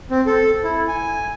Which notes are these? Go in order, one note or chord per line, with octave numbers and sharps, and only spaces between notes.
C4
A4
E4
G#5